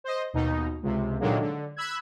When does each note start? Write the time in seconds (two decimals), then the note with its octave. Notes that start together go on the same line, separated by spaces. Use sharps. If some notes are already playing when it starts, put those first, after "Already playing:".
0.04 C5 D#5
0.33 D#2 B2 D#4
0.83 C#2 C3
1.20 A#2 D3 D#3 F#3 G#3 A#3
1.41 D3
1.76 B5 E6 F#6 G#6